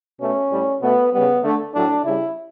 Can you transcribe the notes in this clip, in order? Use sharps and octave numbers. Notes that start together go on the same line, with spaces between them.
B2 A3 C#4
A2 G3
B2 A3 B3
C#3 G3 B3
D3 A3
A2 F#3 A3 D4
C#3 G3 E4